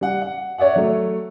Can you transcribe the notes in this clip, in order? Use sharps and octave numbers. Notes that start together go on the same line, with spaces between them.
G3 F#5
F#5
C#5 D5 E5 F#5
F#3 A3